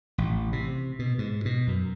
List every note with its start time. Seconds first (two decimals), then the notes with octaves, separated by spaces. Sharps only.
0.18 A1
0.53 C3
0.99 B2
1.18 G#2
1.45 B2
1.67 F#2